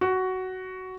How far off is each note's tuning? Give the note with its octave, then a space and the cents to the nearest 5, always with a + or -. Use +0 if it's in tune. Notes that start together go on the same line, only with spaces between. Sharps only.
F#4 +10